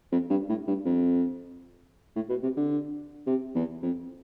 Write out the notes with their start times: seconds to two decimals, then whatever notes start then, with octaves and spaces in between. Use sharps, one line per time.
0.12 F2
0.30 G2
0.49 A2
0.67 G2
0.85 F2
2.16 A2
2.30 B2
2.43 C3
2.57 D3
3.27 C3
3.55 E2
3.83 F2